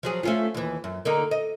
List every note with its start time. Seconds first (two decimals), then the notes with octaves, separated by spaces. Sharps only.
0.03 F3 F#3 G#4
0.23 A3 C#4 F4
0.55 D#2 E3
0.84 F#2
1.05 D3 A#3 D#4
1.31 D#5